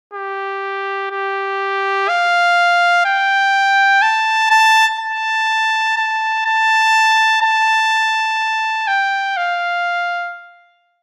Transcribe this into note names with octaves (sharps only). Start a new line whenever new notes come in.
G4
G4
F5
G5
A5
A5
A5
A5
A5
A5
G5
F5